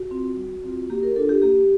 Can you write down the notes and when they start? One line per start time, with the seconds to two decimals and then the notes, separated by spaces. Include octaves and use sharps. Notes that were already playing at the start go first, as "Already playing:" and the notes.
Already playing: F#4
0.11 C4 F4
0.37 G3
0.64 C4 F4
0.90 A#3 G4
1.03 A#4
1.16 D4 F4 A4
1.29 G4
1.42 A#3 G4